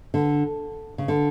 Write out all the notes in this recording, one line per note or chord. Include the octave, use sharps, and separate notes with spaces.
D3
C#3
D3